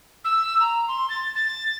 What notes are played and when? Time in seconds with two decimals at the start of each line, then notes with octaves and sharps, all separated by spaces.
0.24 E6
0.60 A#5
0.88 C6
1.09 A6
1.35 A6